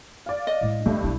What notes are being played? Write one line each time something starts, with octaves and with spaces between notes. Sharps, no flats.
D5 F5
D#5
A2 G#3
G2 D3 A3
B1 E4